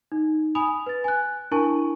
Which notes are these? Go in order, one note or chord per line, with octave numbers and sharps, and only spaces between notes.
D#4
G#5 B5 D#6 F7
B4 A6
G#5 F#6
D4 E4 A#4 G#5 A5 C#6